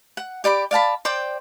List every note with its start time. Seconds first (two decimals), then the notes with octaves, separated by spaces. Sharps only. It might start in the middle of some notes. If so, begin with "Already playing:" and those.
0.17 F#5
0.44 G4 D5 B5 D6
0.71 D5 F5 A5 B5
1.05 C5 D5 G5 D6